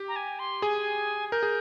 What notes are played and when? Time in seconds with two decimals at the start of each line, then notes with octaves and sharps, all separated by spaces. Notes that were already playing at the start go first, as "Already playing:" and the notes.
Already playing: G4
0.08 A#5
0.16 G#5
0.39 C6
0.62 G#4 G#5
1.32 A#4 G6
1.43 G#4